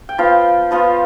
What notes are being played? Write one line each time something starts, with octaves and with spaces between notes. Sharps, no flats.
G5
F3 B3 F4 F5
F3 B3 F4